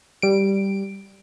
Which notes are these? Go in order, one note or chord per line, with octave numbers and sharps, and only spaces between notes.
G3 D7